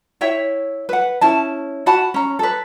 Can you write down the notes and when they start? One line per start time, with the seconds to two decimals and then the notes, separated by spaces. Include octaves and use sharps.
0.21 E4 C#5 E5 G5
0.89 B4 F#5
1.21 C#4 E4 A5
1.86 F#4 F#5 A5 B5
2.14 C#4 A#5
2.39 A4 B4